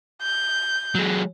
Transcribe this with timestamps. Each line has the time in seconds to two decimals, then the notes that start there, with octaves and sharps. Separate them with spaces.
0.22 G6
0.95 F#3 G#3